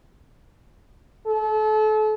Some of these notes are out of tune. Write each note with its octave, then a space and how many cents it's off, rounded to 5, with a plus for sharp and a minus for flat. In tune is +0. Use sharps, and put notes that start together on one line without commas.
A4 -35